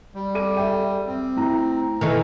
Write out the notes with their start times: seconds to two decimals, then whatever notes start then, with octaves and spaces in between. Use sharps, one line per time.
0.15 G3
0.34 A4 D6 D#7
0.57 A4 E5 G5
1.06 C4
1.36 A3 E4 A#5
2.01 D#3 E3 A3